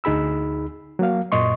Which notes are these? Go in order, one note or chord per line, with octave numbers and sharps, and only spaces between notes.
D2 D#4 G#4 B5 E6
F#3 A#3 F5
F#2 A#2 D#5 C6 C#6